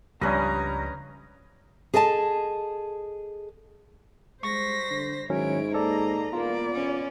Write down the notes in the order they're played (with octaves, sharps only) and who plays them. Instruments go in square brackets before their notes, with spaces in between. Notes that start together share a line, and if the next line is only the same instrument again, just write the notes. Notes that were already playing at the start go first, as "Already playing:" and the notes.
[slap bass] C#2 F3 [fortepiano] G2 G3 [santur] C#4 B4 D#5 [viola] A#5
[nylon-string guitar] G#4 A4 D#5 G5 A5
[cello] G3 C5 [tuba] G#3 [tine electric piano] C#6 [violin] A#6 B6
[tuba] D3
[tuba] G#2 [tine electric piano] D#3 F#3 C#4 [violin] E4 D7 [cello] C#5
[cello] A#3 D#5 [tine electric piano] A4 D5 [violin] A#5
[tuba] E1 [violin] A#3 [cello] B3 D5 [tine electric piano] F4
[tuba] E1 [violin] C#4